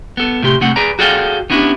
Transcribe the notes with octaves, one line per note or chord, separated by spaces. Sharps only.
B3 A4
A2 C3 G4 C6
C2 A3 C4 F#5
G#4 B4 D5 A#5
F#4 G#4 A4 D5 F5 G5
B3 C#4 D4 E4 F#4 G4